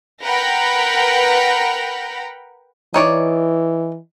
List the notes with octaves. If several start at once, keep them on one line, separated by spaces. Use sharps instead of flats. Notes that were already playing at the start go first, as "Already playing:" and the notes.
A#4 B4 F#5 G5 A#5 B5
E3 D#4 C#5 D5